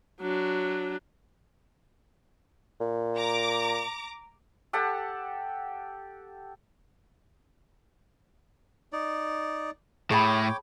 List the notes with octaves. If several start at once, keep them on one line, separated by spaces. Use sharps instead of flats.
F#3 D4
A#2
A#5 D6
G4 A4 F#5 A5
D#4 D5
A2 G#4 C#5 G5 A5 B5 D6